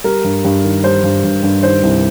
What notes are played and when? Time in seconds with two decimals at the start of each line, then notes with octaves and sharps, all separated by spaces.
0.04 G3 A#4
0.24 G2
0.44 G2
0.64 D#3
0.84 G3 C5
1.04 G2
1.24 G2
1.43 G2
1.63 D#3 C5
1.83 C2